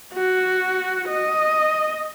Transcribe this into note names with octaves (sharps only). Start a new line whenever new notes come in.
F#4
D#5